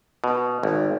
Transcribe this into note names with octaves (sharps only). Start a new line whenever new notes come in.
B2
G#1